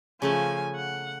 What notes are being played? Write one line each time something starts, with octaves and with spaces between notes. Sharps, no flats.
C#3 F3 A3 G#5 A5
F#5